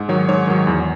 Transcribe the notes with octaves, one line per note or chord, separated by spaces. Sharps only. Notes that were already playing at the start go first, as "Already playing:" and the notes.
Already playing: G#2
D#3 F#3 C#5
G#2 C#5
D#3 F#3
E2